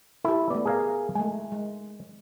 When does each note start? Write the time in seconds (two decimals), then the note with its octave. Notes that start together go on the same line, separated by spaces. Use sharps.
0.25 E4 G4 A4
0.50 A3 B3 D5
0.65 G#4 A#4 F5
1.15 G#3 A3 G#5
1.52 G#3